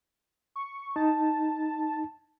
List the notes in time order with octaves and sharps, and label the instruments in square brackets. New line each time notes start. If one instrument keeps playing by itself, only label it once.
[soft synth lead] C#6
[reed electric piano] D#4 [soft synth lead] A5